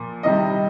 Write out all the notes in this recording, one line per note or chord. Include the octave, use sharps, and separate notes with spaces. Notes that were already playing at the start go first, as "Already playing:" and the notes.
Already playing: A#2 F3
C3 D#3 G3 D#5